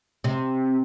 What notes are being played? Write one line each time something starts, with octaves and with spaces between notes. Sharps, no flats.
C3